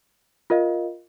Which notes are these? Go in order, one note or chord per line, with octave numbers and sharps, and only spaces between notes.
F4 A#4 D#5 F5